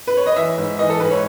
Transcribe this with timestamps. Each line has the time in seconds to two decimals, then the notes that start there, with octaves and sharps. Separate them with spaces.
0.07 B4
0.17 C#5
0.26 D#5
0.36 E3 E5
0.58 G#2
0.79 E3 D#5
0.90 A4
1.00 G#2 B4
1.11 C#5